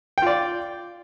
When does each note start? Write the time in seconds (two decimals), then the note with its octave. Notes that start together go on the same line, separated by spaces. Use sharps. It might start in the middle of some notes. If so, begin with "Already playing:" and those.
0.18 G5
0.22 F4
0.27 D5